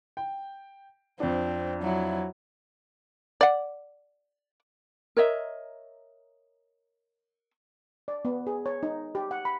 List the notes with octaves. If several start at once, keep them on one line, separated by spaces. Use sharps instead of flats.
G5
F2 C4 D4
F#3 E4
D5 F#5
A#4 C#5 D#5 E5
D5
B3
G#4
C#5
D#4
G4
F#5
B5